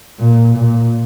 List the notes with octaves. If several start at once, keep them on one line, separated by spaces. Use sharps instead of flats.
A#2
A#2